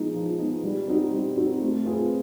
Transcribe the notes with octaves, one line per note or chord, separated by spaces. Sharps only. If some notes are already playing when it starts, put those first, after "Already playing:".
Already playing: F3 G#3 B3 D#4
F3
G#3 B3 D#4
G3
C4 D#4 F#4
G3
C4 D#4 F#4
A3
C4 F4 G#4 B4